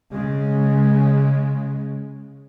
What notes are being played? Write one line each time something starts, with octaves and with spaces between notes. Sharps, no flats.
C#3 G#3